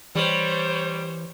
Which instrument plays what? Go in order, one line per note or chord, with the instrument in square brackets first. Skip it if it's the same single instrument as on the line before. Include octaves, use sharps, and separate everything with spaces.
[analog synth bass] E3 [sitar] G3 [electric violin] C5 C#5